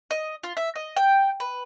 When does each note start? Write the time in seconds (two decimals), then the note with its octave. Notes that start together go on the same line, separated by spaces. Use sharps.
0.11 D#5
0.44 F4
0.57 E5
0.76 D#5
0.97 G5
1.40 B4